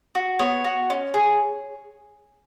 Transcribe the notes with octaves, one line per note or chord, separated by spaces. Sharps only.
F#4
B3 C#5
F#4
C#4
G#4